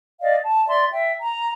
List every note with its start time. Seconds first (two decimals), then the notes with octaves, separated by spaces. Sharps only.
0.20 D5 D#5 F5
0.42 A5
0.66 D5 E5 C6
0.92 E5 G5
1.22 A#5